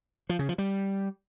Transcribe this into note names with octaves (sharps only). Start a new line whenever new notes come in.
F3
C#3
F3
G3